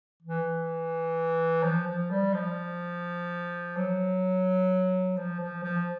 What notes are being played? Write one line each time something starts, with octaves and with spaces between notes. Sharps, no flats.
E3
F3
F3
G3
F3
F#3
F3
F3
F3